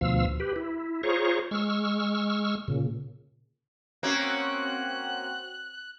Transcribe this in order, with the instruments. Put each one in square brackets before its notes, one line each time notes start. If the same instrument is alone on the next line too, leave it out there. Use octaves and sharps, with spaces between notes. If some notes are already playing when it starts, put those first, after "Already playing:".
[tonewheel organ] D2 B2 F3 F5 E6
G4 B4
E4
F4 G#4 C5 C#5 A#5 C#6
G#3 C#6 E6 F6
A#2 C#3
[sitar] A#3 C#4 [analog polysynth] C4 F#4 [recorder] F#6